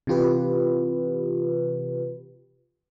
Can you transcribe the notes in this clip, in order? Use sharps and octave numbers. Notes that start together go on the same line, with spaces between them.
C3 E3 F4 G4 B4